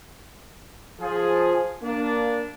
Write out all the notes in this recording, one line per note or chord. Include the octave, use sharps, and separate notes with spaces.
F3 G#4
A#3 D4